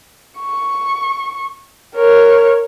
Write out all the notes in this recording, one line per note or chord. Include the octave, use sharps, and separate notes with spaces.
C#6
A#4 C#5